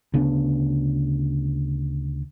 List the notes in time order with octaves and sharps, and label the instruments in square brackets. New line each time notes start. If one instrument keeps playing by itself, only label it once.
[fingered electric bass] D2 C#3 B3 D4